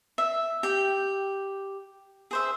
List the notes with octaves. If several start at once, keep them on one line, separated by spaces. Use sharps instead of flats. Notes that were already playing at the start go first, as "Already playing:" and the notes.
E5
G4 G5
G#4 C5 E5